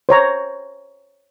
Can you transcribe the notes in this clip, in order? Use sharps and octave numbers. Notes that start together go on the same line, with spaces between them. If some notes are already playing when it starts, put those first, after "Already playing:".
C5 C#5 A#5